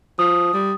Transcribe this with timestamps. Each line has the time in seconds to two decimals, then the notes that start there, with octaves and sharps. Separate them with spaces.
0.19 F3 D#6
0.54 G3